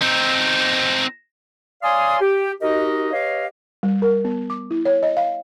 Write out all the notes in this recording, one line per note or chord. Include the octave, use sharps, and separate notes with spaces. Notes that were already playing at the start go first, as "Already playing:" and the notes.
C4 D#4
C#5 D5 F5 G#5 C6 D#6
G4
D#4 F#4 G4 A#4 D#5
G4 B4 C#5 D#5 F5
G3
A#4
B3
D6
E4
C#5
D#5
F5